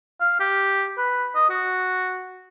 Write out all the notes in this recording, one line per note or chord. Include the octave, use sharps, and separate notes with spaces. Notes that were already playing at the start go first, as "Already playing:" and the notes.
F5
G4
B4
D#5
F#4